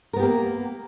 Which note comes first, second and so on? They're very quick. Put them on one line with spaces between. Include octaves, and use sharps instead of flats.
A#4 B3 G4 A#3